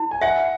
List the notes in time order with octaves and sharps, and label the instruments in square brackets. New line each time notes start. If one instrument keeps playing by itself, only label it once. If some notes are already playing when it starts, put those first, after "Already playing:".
Already playing: [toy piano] E4
[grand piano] G#5
[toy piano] E5 [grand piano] F#5